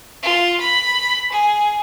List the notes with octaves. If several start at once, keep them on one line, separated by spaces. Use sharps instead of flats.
F4
B5
G#4